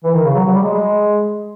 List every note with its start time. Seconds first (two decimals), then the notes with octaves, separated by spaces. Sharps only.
0.04 E3
0.14 D#3
0.24 C#3
0.34 F#3
0.44 F#3
0.53 G3
0.63 G#3
0.73 G#3